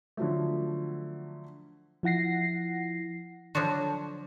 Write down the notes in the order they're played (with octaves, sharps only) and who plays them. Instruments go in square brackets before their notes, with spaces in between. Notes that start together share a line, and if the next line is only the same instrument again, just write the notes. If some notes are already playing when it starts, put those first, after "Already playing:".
[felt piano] D3 F3 F#3 A3
[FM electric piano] F3 E4 F#5 A#6 C7
[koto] D3 F3 F#3 D4 F#4